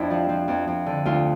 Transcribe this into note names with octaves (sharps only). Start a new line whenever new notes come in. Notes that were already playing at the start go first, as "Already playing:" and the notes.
Already playing: F2 C4 D4 E4
F3
F3
F2
F2
D3
D2 F4